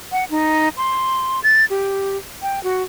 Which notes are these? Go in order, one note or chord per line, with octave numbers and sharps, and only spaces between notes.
F#5
D#4
C6
A6
G4
G5
F#4